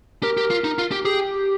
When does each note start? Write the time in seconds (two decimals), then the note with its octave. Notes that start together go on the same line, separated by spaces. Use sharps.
0.23 G4 A#4
0.37 G4
0.51 F4
0.64 D#4
0.78 F4
0.92 G4
1.05 G4 G#4